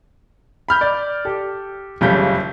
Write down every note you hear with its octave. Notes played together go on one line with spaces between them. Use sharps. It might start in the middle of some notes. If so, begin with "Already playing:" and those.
B5 F6 G6
D5
G4 A4
F#1 C#3 G3 F4 A4 G6